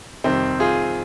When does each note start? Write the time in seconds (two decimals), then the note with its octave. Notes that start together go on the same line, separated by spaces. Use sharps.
0.24 F2 C3 D#3 G3 C4
0.60 F4 G#4